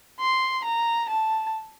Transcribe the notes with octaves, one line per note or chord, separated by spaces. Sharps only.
C6
A#5
A5